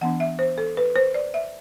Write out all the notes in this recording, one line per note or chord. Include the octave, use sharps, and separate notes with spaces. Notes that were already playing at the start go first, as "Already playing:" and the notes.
E3 B3 D4 F#5
E5
C5
A4
B4
C5
D5
E5